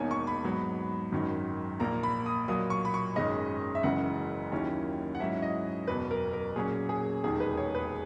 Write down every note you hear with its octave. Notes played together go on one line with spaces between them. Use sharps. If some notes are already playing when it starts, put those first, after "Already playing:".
Already playing: E1 E2 D#3 A#3 D#4 C#5 G#5
C#6
B5
G#2 F#3 B3
G#1 F#2 D#3 F#3
A#1 A#2 A#3 A#5
B5
D#6
B1 A#2 F#3 A#3 D#6
C#6
B5
C#6
G#1 F#2 D#3 G#3 C#4 D#5
E5
F#1 F#2 C#3 E3 G#3 F#5
D#2 D#3 F#3 C#4 E4
F#5
G#2 F#3 C#4 E4 E5
D#5
F#1 E2 B2 F#3 B4
A#4
A#4
A#2 F#3 C#4 G#4
G#4
E1 D#2 D#3 G#4
B4
C#5
B4